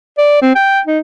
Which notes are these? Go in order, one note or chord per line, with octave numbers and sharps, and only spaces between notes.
D5
C4
G5
D#4